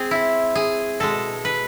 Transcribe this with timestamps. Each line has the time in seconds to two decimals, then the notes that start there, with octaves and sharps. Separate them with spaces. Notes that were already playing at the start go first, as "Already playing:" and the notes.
Already playing: G#3 C4 G#4
0.11 E4
0.55 G#4
1.00 B2 G#3 A4
1.45 B4